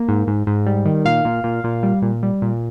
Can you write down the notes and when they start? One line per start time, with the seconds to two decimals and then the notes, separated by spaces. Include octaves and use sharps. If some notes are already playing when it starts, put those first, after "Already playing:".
Already playing: A#3
0.09 G#2
0.27 G#2
0.47 G#2
0.66 G3
0.85 D#3
1.05 A#2 F5
1.25 A#2
1.44 A#2
1.64 A#2
1.83 G3
2.02 A#2
2.23 G3
2.42 A#2